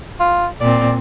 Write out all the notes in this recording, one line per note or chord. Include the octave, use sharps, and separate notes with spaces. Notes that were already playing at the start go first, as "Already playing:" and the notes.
F4
A#2 C4 D5